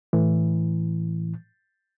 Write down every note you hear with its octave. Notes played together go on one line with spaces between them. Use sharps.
A2 E3